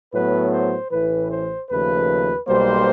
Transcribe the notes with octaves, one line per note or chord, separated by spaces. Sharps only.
A2 F#3 B3 B4
C5
A1 A2 E3 B4
C5
D#2 C#3 F3 A3 B4
B1 B2 G3 A#3 C5